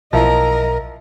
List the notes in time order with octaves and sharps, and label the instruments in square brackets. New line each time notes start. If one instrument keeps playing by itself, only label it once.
[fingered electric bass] B1 [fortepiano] F3 E4 [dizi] A#4 [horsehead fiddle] D#5 A#5